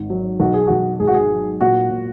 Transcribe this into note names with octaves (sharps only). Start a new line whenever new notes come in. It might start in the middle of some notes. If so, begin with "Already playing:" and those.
Already playing: G#1
F#3
B1 F#4
G#4
B1 F#4
G#1 G#4
F#4
G#4
F#3
A#2 F#4
A#2